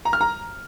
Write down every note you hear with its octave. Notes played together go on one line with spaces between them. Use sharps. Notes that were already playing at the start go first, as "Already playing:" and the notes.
A#5
F6
A#5